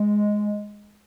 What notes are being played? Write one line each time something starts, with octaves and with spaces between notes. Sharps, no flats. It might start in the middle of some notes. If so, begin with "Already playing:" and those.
Already playing: G#3